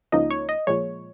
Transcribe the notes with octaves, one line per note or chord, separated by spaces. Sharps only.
C#2 C#3 F3 A#3 D#4 D#5
C#5
D#5
A#2 F3 G#3 C#5